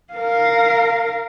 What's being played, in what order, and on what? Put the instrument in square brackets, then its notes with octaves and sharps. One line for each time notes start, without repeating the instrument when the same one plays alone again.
[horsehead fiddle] A#4 F5